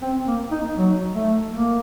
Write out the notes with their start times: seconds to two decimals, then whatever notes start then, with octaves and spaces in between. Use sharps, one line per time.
0.02 C4
0.27 A#3
0.51 D#4
0.77 F#3
1.15 A3
1.54 A#3